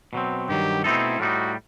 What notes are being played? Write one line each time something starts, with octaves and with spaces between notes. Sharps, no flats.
B2 F#3 C4
G2 D#3 F#3 G4
B2 A3 C4 D#4 E4 A4
A2 G3 B3 D#4 F#4